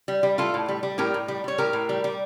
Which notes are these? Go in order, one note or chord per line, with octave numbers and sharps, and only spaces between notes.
G3
G3
A2 F4 A4
A2
G3
G3
A2 G4 A#4
A2
G3
G3 C#5
A2 G4 A#4
A2
G3
G3